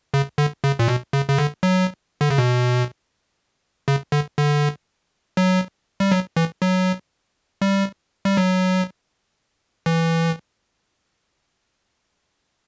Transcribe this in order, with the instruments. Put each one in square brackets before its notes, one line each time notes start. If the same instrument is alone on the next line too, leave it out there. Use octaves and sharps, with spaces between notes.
[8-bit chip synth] C#3
D3
C#3
A#2
B2
C#3
C#3
D3
F#3
D3
C#3
B2
C#3
D3
D3
F#3
G3
F#3
E3
F#3
G3
G3
F#3
E3